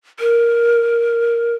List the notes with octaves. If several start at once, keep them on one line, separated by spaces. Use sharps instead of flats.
A#4